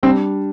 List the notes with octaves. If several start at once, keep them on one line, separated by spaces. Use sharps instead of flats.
G3 C4 D4